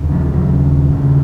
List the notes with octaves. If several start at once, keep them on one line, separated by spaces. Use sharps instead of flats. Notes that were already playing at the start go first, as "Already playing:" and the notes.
Already playing: D#2 C#3
F3
D#2 C#3 F#3
D#2 C#3